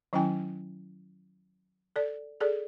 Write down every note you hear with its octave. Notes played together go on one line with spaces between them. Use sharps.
D#3 F#3 C#4 E4 G5 G#5
A4 D5
G#4 A4 D5